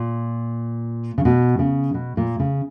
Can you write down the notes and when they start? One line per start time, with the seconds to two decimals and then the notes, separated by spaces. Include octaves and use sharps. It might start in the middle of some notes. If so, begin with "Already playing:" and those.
Already playing: A#2
1.18 C#3
1.25 B2
1.59 C#3
1.94 B2
2.17 A#2
2.40 C#3